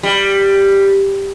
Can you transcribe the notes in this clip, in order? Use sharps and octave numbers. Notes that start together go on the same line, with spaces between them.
G3